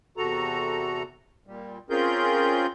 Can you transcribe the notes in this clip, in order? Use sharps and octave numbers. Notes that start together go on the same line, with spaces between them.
E2 C3 F#4 A4 A#5
A#2 G3
C4 C#4 F4 G#4 A#4 G6